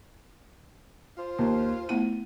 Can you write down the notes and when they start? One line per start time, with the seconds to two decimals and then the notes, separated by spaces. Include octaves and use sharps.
1.18 F4 C5
1.39 D#2 A#5
1.89 A3 B3 E4 D#7